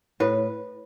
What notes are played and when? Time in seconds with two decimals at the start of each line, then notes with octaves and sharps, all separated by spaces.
0.20 A2 B4